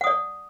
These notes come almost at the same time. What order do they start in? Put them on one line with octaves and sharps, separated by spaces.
F#5 D#6 D5